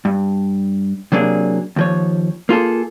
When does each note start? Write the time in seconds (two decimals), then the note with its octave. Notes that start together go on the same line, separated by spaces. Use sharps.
0.05 G2
1.12 C3 F#3 A#3 D4 G#4
1.76 D#2 F3 C#5
2.49 A#3 F4 G#4 A4